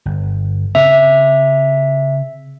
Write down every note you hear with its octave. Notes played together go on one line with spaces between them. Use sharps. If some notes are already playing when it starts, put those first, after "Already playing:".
G1
C#3 C4 E5